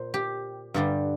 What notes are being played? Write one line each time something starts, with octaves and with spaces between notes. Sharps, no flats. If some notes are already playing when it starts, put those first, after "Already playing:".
Already playing: A#2 C5
G4
G2 D3 G3 D4